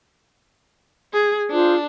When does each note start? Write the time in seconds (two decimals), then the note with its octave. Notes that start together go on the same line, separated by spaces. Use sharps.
1.13 G#4
1.51 D4 F4 G#4 C5